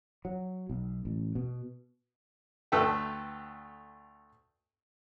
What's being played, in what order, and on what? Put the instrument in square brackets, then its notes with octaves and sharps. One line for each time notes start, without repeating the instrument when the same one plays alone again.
[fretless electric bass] F#3
B1
A1
B2
[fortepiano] D2 A3 A4 B4 G5